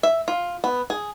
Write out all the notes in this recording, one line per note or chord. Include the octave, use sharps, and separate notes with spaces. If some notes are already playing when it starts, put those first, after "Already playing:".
E5
F4
B3
G#4